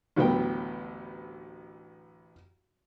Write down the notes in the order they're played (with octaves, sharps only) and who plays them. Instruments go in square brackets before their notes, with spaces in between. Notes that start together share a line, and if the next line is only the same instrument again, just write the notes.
[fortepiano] A1 D2 A2 F#3 B3 G5